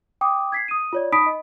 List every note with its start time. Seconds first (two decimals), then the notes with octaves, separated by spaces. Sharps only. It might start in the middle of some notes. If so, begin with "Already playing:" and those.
0.21 G5 D6 D#6
0.52 G#6 B6 C7
0.68 D#6 D#7
0.93 F4 C#5 D5
1.12 D#4 B5 D#6 B6 D7
1.26 D#5